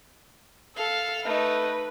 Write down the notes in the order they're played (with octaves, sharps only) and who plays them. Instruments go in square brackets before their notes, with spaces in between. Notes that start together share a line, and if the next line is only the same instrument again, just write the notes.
[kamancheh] A4 [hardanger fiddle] F5
[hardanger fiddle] A3 D#4 [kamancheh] B4